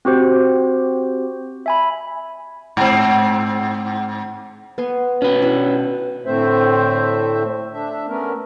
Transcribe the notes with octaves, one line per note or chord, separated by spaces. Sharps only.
C4 F#4 G4 C5
E5 G#5 B5
G#2 C4
B3 G#5 C6
B2 C#4 B4 B5
B2 D4 E4
A2 D3 A3 C4 C5 E5
D4 E5
A3 B3 C#4 A#4